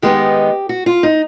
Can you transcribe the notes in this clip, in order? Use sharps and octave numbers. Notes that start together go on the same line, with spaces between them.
D#3 G#3 B3 D#4 G4
F#4
F4
D#4